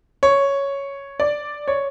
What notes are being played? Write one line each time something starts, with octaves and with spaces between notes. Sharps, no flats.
C#5
D5
C#5